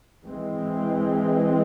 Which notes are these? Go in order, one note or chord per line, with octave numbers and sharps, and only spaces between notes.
E3 G#3 C4